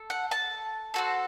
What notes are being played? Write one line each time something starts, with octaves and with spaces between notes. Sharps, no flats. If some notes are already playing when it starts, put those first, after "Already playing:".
Already playing: A4
F#5
A5
C4 F#4 A4